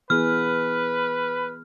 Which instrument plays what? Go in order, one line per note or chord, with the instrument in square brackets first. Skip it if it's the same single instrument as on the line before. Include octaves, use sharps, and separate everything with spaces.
[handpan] E3 B3 G#4 [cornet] B4 [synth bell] F6